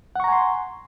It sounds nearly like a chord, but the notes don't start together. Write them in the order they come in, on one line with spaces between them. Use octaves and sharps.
F#5 C#6 A#5 G#5 C6